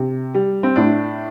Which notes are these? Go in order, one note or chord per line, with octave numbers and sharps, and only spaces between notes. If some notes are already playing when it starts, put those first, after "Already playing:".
Already playing: C3
G3
C4
A2 D4